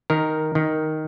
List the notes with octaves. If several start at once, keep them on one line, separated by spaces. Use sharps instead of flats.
D#3 A#4
D#3